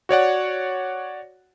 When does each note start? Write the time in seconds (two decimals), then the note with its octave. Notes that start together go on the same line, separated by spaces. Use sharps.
0.09 F#4 C#5 D5 F#5